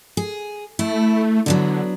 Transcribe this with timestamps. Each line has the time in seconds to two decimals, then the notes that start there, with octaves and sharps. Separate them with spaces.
0.17 G#4
0.79 A3 E4
1.46 D3 F#3 B3 D4